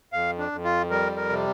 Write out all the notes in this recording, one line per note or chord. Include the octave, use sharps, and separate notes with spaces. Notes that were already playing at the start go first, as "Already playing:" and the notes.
F2 F5
D4
F2
F4
G3 A#4
A#4
C3